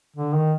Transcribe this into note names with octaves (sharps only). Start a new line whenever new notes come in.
D3
D#3